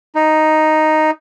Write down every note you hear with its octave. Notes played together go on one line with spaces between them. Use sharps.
D#4